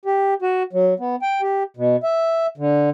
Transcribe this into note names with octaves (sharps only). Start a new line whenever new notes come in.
G4
F#4
F#3
B3
G5
G4
B2
E5
D3